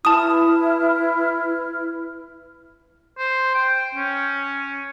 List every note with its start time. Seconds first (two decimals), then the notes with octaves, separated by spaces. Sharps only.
0.05 E4 B4 A5 D#6 F6
3.18 C5
3.55 G5
3.95 C#4